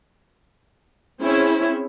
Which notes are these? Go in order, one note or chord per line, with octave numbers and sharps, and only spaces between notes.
C4 C#4 E4 G#4